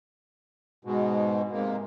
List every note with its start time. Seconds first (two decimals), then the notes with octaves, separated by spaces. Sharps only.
0.85 G#2 B2
1.52 G#2 C3 A#3